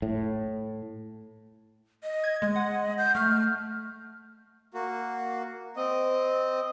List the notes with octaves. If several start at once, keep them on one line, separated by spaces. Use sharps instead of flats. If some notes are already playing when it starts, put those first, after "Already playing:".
A2
D#5
G#6
G#3 D#5
F#5
G6
A3 F6
A#3 F#4
C4 D#5